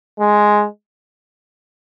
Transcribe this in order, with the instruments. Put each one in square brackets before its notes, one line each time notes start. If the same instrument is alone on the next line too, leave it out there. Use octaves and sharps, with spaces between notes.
[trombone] G#3